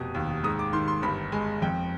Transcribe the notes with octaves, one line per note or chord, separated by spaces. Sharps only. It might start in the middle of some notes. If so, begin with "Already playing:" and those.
Already playing: F1 B2 D#6
D#2
G#2 D#6
D6
D#3 C6
C6
G1 B5
G#3 G#5
F2 G5